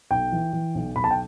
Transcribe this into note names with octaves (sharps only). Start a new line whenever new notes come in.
B1 G5
E3
E3
B1
B1 B5
A5
G5